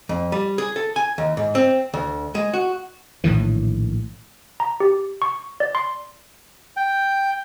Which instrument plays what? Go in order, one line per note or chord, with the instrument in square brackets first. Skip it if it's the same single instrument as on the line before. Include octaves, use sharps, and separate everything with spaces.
[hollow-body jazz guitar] F2
G3
G#4
A4
G#5
D#2
G#2
C4
D2
G#3
F#4
[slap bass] A#1 A2 D#3 E3
[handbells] A#5
G4
C#6
D5
C6
[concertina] G5